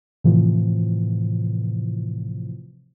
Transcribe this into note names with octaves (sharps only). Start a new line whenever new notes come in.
A2 C3 E3 F3